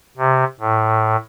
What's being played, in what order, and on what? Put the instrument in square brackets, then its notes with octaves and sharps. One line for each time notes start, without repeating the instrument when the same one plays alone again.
[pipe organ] C3
A2